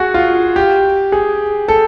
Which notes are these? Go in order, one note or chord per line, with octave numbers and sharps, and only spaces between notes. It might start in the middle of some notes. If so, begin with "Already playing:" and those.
Already playing: F#4 G#4
F4
G4
G#4
A4